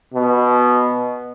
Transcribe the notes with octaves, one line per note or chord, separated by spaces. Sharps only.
B2